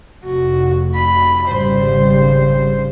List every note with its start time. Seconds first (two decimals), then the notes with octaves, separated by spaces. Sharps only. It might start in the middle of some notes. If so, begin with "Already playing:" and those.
0.24 F1 F2 F#4
0.94 B5
1.48 G#1 C#3 G3 C5